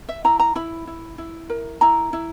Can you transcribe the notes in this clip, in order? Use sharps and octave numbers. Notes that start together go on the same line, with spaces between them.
E5
E4 A#5
A#5
E4 B5
E4
E4
A#4
E4 A#5
E4